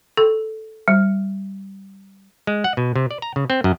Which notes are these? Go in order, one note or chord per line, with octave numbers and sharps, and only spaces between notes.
A4
G3
G#3
F#5
B2
C3
D5
A#5
C#3
C4
F#2